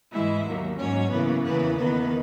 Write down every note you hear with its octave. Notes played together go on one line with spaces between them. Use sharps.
G#2 E3 G#3 E4 E5
D#2 D#3 F#3 A#3
G#2 F#3 A#3 C#4 C#5
F#2 C#3 E3 A#3 B3 B4
E2 C#3 E3 A#3 B3 B4
E2 D#3 A#3 B3 B4